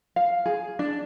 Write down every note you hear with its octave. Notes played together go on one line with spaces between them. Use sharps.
F5
G#4
D4